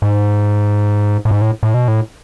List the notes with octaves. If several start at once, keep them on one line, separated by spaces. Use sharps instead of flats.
G#2
A2
G#2
A2
A2
B2
A2